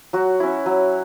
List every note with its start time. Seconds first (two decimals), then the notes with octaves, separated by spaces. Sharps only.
0.13 F#3 F#4
0.40 C#4 E4
0.66 F#3